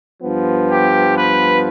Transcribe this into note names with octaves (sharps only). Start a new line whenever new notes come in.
G2 F3 B3
G4
B4